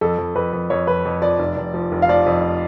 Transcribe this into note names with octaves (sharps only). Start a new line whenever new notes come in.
F2 A4
F2
F2 B4
F2
F2 C#5
F2 B4
F2
F3 D5
F1
F1
F3
F1
F5
F3 D5
F2